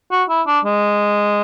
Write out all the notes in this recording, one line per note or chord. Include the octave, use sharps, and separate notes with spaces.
F#4
E4
D4
G#3